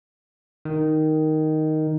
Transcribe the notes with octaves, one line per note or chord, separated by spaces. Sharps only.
D#3